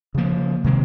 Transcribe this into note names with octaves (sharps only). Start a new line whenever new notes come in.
C#3 F3 A#3
C3 D#3 G#3 C4